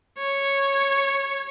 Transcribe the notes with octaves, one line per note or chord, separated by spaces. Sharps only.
C#5